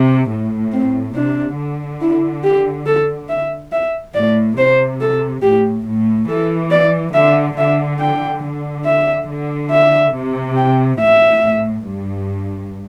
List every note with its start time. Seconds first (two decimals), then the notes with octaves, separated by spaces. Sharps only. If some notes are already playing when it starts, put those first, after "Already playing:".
Already playing: C3
0.30 A2
0.72 C4
1.15 C3 D4
1.58 D3
2.01 E4
2.44 G4
2.87 A4
3.29 E5
3.72 E5
4.15 A2 D5
4.58 C3 C5
5.01 A4
5.43 A2 G4
5.86 A2
6.29 E3 A4
6.71 D5
7.14 D3 E5
7.58 D3 E5
8.00 G5
8.43 D3
8.86 E5
9.28 D3
9.72 E5
10.14 C3
10.57 G5
11.00 A2 E5
11.85 G2